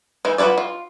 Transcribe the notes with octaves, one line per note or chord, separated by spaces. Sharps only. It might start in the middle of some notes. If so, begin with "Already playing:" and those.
E3 G#3 D#4
F4 F#4 A4 B4 D5
F4